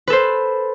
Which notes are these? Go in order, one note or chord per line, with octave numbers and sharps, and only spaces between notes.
A4 B4 C5